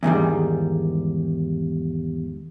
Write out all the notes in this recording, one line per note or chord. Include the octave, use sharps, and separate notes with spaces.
E2 G#2 D#3 G3